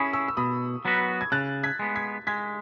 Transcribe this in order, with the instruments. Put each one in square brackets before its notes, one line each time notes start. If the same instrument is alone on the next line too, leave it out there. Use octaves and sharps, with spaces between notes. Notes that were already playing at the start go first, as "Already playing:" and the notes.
Already playing: [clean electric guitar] C#4 E4 G#4 [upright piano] B5 C#6 D#6
[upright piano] C#6 E6
E6
[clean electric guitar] B2 [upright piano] B5 D#6
[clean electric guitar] F#3 B3 F#4 B4
[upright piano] G#6
[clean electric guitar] C#3 [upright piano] F#6 A6
[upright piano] G#6 B6
[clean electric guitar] G#3 B3
[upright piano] G#6 B6
[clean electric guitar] G#3 [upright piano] G#6 B6